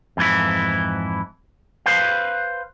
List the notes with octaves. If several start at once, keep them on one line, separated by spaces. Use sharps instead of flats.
F2 G#2 E3 E4
B4 C5 F5